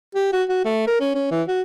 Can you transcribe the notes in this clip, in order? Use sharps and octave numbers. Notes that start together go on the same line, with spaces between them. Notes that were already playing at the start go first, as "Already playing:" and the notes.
G4
F#4
F#4
A3
A#4
C#4
C#4
E3
F#4